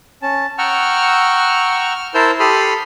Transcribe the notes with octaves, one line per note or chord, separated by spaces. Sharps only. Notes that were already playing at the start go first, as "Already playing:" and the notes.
C#4 A5
F#5 G5 A#5 C#6 E6 F6
F6
E4 A#4 C5 A5 E6 G6
G4 A4 B5 C6 D#6 F6